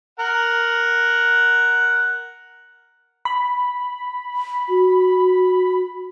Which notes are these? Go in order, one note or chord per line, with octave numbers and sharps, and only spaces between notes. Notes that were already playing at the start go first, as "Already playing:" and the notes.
A#4 F#5
B5
F#4